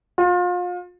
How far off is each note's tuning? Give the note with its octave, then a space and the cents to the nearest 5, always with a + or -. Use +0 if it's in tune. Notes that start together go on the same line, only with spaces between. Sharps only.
F4 +35